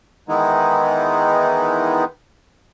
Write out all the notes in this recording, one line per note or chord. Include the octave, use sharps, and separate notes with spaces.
D#3 E3 G#3 B3 D#4 E4